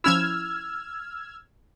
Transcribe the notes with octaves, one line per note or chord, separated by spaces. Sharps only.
F3 C#4 E4 E6 F6 G#6